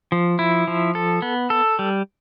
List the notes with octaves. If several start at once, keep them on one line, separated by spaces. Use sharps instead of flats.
F3
E4
F3
A4
B3
A4
G3